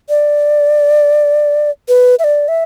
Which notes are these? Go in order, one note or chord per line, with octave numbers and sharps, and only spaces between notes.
D5
B4
E5
D5
E5